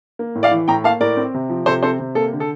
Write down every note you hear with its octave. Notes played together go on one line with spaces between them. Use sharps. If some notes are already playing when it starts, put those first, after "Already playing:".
A#3
A2
D5 F5
E3
A2 G5 A#5
A#3 F5 A5
A2 A#4 D5
C4
C3
F3
C3 A4 C5
C4 A4 C5
C3
A#3 A4
D3
A4